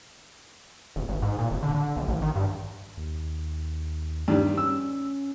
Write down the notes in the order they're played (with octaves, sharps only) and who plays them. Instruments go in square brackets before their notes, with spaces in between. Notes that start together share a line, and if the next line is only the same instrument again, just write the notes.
[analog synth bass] D#1
G#1
G#2
A#2
D#1
D3
D3
B1
A1
D#3
G2
D#2
[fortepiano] G2 D#3 G3
[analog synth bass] C#4 [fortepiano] E6